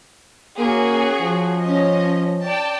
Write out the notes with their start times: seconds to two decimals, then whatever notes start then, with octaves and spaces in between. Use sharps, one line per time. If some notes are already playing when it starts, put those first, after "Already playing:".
0.59 A#3 C#4 F#4 G#4
1.21 F3
1.62 C#4 D#5
2.43 D5 G5 A5